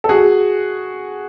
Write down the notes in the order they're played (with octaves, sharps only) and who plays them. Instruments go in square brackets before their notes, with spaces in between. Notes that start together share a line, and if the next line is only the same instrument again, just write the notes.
[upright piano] A4
F#4 G#4